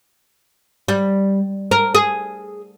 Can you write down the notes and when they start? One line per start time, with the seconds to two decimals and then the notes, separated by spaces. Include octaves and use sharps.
0.88 G3
1.71 A#4
1.95 G#4